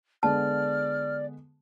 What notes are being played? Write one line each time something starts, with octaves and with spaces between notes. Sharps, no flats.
D3 G#3 B3 D5 A5 F6